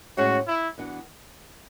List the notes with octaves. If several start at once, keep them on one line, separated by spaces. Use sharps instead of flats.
A2 G#3 C#4 F#4 G#4 C#5
E4
E3 B3 D4 F#4